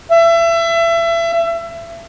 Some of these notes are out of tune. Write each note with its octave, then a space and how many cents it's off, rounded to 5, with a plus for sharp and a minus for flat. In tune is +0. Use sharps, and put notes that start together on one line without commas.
E5 +30